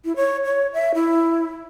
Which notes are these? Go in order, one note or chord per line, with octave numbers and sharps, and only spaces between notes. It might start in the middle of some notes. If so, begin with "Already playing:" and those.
E4
C#5
C#5
E5
E4